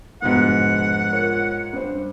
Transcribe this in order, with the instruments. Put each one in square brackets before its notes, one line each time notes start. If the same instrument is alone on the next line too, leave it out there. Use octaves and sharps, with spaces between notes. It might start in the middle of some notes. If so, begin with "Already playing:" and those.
[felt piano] F1 B2 D3 [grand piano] G#2 B3 [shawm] F#5
[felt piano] F4 A#4 C#5
G2 C5